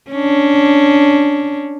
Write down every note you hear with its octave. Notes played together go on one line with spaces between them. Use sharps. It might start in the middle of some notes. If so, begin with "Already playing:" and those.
C#4 D4